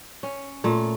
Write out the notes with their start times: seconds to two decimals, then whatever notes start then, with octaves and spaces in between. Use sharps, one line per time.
0.23 C#4
0.64 A#2 A3